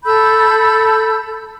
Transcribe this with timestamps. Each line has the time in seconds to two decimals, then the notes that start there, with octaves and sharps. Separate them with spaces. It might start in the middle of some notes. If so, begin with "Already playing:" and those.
0.05 A4 B5 E6 G6